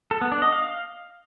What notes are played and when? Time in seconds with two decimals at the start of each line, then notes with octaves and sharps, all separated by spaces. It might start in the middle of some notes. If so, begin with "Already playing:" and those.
0.11 A4
0.21 B3
0.32 D4
0.42 D#5
0.52 F5